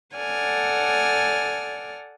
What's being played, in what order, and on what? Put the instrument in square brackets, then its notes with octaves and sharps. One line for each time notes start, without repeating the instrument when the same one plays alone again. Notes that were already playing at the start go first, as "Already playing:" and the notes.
[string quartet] A4 D5 F#5 G#5 F6